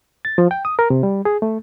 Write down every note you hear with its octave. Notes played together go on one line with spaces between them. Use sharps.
A6
F3
G5
D#6
A#4
C3
G3
G#4
A3